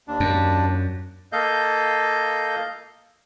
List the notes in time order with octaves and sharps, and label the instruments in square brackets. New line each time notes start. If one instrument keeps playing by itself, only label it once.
[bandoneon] D#2 D4
[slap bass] F#2
[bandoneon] A#3 A4 D#5 F5 G6